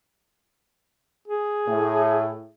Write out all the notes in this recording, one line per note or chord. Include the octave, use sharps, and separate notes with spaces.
G#4
A2